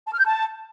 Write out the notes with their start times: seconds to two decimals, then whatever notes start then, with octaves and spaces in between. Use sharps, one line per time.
0.06 A5
0.13 F6
0.19 G6
0.25 A5